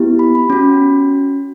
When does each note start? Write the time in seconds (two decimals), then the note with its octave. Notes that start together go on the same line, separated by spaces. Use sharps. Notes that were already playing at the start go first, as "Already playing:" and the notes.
Already playing: B3 E4 G4
0.19 B5
0.35 B5
0.50 C#4 F#4